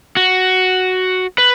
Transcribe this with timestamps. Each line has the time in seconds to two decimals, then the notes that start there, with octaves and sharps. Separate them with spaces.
0.17 F#4
1.38 B4